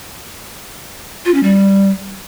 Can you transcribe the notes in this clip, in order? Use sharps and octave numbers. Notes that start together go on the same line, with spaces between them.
F4
C#4
G3